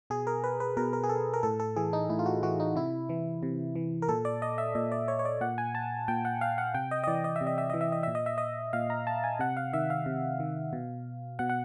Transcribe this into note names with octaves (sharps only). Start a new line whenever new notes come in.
B2 G#4
A#4
B4
B4
B2 A#4
A#4
G#4
A4
A#4
A2 A4
A4
E3 G#4
D#4
A2 E4
F4
F#4
E3 F#4
D#4
C3 E4
E3
C3
E3
A#4
A#2 A4
D5
D#5
E5
A#2 D#5
D5
C#5
C#5
D5
A#2 F#5
G#5
A5
A#2 G5
F#5
F5
F#5
C3 G5
D#5
D#5
E3 D5
D#5
E5
C3
D#5
E5
E3 D#5
E5
D#5
A#2 E5
D#5
E5
D#5
A#2 F5
A#5
A5
G#5
C3 F#5
F5
D#3 E5
F5
C3
D#3
B2
B2 F#5
F#5